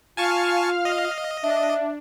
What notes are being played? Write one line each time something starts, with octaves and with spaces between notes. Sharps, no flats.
F4 F5 G#5 A5 C#6 F6
D#5
D4 E5